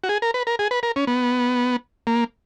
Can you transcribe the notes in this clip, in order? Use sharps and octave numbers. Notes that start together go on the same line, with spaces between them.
F#4
G#4
A#4
B4
A#4
G#4
B4
A#4
C#4
B3
A#3